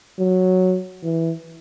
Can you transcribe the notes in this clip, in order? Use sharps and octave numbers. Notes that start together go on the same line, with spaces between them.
F#3
E3